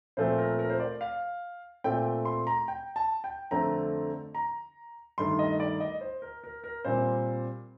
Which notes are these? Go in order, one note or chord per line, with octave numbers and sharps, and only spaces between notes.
A#2 F3 A3 C4 C5
A#4
A#4
C5
D5
F5
A#2 A3 C4 G5
C6
A#5
G5
A5
G5
F2 D3 A3 C4 A#5
A#5
G2 D#3 A3 C6
D#5
D5
D#5
C5
A#4
A#4
A#4
A#2 G3 C4 C5